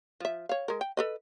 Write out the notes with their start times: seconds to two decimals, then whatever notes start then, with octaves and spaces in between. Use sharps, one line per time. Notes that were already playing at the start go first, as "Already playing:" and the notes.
0.20 F3 E5
0.49 C#5 F5
0.68 G#3 A#4
0.81 G5
0.97 A4 B4 D#5